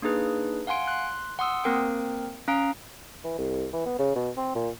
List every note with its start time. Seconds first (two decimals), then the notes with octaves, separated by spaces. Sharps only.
0.02 A#3 D4 D#4 G#4 B4
0.67 F5 F#5 G#5 C6 D7
0.87 C6 F#6
1.39 F#5 C6 D#6 E6
1.64 A#3 C4 A#4 G5
2.48 C#4 F5 A#5 D#6 D7
3.24 E3
3.39 C2
3.73 E3
3.86 B3
3.99 C#3
4.16 B2
4.37 C4
4.55 A#2